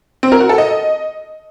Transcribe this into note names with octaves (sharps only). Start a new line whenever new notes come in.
C4
A#4
F#4
A4
D#5